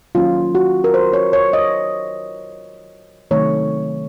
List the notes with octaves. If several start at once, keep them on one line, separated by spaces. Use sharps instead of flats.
D#3 F#3 A#3 C#4 F4
F#4
A#4
C5
C#5
C#5
D#5
C3 D#3 F#3 A3 C4 C#5